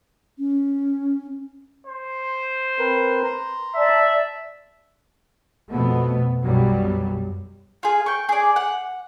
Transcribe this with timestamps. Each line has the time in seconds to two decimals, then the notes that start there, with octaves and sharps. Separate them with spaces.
0.39 C#4
1.87 C5
2.79 C4 A#4 B4
3.24 A#5 C6
3.75 D5 E5 A5
5.71 F2 B2 A3 B3
6.42 B1 F#2 B2 F#3 G3
7.83 F4 G#4
8.06 G5 C#6
8.29 G#4 D5
8.56 F#5